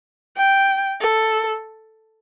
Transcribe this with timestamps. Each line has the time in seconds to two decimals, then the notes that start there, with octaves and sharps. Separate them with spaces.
0.37 G5
1.01 A4